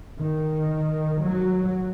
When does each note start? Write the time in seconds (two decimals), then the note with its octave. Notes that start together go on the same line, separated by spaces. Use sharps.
0.20 D#3
1.22 F#3